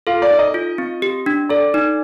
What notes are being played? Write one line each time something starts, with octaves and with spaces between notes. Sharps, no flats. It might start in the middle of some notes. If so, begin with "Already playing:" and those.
F4 A4
D5
D#4
D#5
F4
C4
G4
D4
A4 D5
D#4